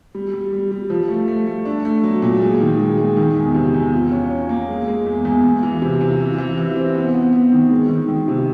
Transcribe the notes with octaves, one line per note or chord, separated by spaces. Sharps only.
G3
G3
G3
G3
F3
A3
A3
A3
D4
A3
F#3
A#2
G#3
D#3
G#3
G#3
D#3
E2
C3
E2
F4
C#4
C#4
A#3
G#3
G#3
E2
E2
E2
E3
C3
C3
E3
E3
E3
C4
B3
B3
B3
D#3
G#3
D#3
D#3
C3